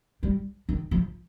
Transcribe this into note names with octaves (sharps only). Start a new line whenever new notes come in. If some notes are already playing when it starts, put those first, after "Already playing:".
G3
D#3
F3